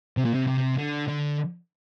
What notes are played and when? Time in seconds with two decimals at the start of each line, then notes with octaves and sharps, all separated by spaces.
0.17 C3
0.25 A#2
0.34 C3
0.47 C3
0.78 D3
1.08 D3